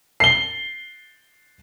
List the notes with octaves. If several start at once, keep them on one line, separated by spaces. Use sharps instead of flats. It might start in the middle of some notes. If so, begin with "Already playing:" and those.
C7 G7